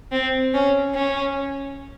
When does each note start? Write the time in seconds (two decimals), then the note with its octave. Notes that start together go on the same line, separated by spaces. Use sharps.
0.12 C4
0.54 C#4
0.95 C#4